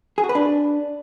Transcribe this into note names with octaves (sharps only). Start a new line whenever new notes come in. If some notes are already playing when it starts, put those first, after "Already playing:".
G#4
F#4
B4
D4